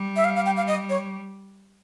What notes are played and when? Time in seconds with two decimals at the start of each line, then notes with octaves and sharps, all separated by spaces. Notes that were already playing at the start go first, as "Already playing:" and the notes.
Already playing: G3
0.16 E5
0.25 F5
0.36 F5
0.46 G5
0.57 F5
0.68 D#5
0.90 C#5